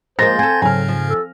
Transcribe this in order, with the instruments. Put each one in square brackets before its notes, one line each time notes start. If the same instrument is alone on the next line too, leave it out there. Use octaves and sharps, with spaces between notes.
[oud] F3 G#3 A#3 [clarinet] C5 [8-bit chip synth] C6 G6 A6 [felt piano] A#6
[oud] C4 A4 [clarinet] G#5
[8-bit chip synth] G#2 C#3 [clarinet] F#3 [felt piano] G#5 F6
[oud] F3
[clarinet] A4